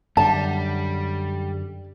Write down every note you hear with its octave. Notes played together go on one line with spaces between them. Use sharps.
F#2 D3 G3 A5